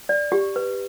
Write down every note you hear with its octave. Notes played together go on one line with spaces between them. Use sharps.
D5
G4
B4